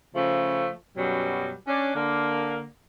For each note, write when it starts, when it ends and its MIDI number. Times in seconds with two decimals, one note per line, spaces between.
0.15 0.68 49
0.15 0.68 53
0.15 0.68 57
0.96 1.52 42
0.96 1.52 47
0.96 1.52 54
0.96 1.52 55
1.66 1.91 61
1.66 1.91 62
1.94 2.65 50
1.94 2.65 58